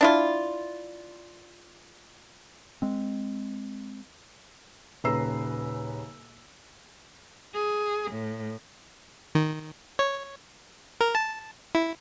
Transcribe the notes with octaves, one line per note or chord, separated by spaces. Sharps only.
D4 E4 F4
G#3 C4
D#1 C#3 B4 A#5 E6 C7
G#4
A2
D#3
C#5
A#4
A5
E4